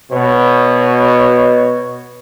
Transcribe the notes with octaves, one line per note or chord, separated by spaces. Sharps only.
B2 C#5